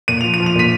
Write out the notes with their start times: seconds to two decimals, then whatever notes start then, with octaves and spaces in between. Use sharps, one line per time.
0.08 A#2 D#7
0.21 F3 F7
0.34 D#7
0.40 F3
0.46 F7
0.55 A#2 B6 D#7